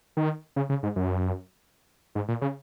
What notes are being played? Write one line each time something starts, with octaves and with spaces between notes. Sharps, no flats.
D#3
C#3
C#3
G#2
F#2
G#2
A#2
C#3